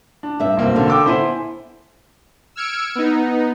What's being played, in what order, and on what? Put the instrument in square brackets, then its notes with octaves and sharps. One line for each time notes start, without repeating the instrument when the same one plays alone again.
[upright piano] D4
[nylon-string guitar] G2 E5
[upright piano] B1 A#3 C4
[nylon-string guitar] D3
[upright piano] G5 D6 E6
[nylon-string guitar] B3 E4 G#5 [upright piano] C5
[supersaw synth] E6 F6 G#6 C#7 D7
B3 D#4